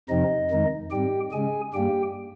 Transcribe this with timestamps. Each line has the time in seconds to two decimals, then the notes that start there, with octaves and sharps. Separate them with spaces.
0.09 F2 C3 F3 C4 D#4 D#5
0.50 F2 D#3 G#3 D#4
0.91 G#2 G3 C4 G4 G5
1.32 C#3 G#3 C#4 G#4 G#5
1.74 G2 G3 A#3 G4 G5